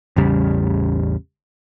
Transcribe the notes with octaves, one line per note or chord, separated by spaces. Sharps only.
A1 E2 C#3 G3